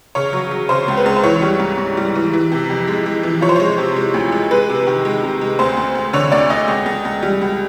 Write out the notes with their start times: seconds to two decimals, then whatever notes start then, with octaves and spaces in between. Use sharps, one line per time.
0.15 C#3 C#5
0.33 F#3
0.51 F#3
0.69 C#3 C5
0.88 C#2
0.97 B4
1.06 C#2
1.17 C5
1.23 E3 C#5
1.42 G3
1.60 G#2
1.78 G#2
1.97 G3
2.15 E3
2.33 E3
2.52 C3
2.70 F2
2.88 G#3
3.06 G#3
3.23 E3
3.41 F3 C#5
3.49 C5
3.56 G#3 C#5
3.78 C3
3.96 G#3
4.14 D2
4.32 G#3
4.51 G#3 B4
4.69 C3
4.87 D#3
5.05 G#3
5.23 C3
5.41 G#3
5.59 D2 C5
5.77 D2
5.95 D2
6.13 D3 C#5
6.32 D2 D5
6.50 D2 D#5
6.68 C#2
6.86 C#2
7.05 C#2
7.22 G3
7.42 C#2